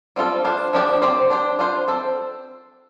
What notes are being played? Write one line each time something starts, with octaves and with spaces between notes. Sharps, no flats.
G3 C4 F4 A4
D4 F4 C5
F3 D4 G4 D5
C4 G4 C5
D4 G4 C5
D4 F4 C5
C4 A4 C5